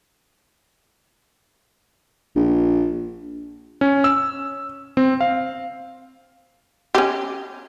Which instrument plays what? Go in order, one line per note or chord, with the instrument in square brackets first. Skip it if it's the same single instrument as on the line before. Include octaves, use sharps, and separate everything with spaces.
[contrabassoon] A#1
[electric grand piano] C#4
E6
C4
F5
[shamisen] C#4 G4